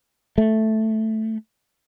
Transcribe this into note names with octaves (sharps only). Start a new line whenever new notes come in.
A3